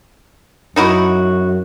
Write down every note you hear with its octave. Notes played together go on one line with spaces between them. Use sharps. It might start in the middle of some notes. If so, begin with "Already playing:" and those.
F#2 D#4 E4 F#4